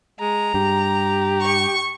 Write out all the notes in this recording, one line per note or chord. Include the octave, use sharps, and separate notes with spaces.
G#3 A#5
G2 G4
C#6